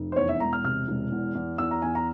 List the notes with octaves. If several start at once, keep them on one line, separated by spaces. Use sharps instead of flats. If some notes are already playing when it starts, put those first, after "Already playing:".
Already playing: F1
C5
E2 C#5
E5
E1 A#5
F6
C3 F6
E1
E2
E2
E2 E6
A#5
E2 G#5
A#5